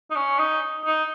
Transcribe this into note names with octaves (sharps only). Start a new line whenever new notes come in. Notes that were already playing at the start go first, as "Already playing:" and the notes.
D#4
C#4
D#4
D#4